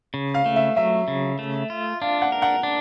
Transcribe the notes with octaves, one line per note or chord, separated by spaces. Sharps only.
C#3
F5
A3
E5
F#3 E5
C#3
A3
F4
D4 F5
F#5
A#4
F#5
D4